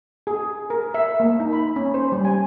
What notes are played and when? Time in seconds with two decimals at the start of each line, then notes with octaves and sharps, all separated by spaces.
0.27 G#4
0.70 A#4
0.94 E5
1.20 A#3
1.40 D#4
1.53 B5
1.76 C#4
1.94 C5
2.12 G3
2.25 G#5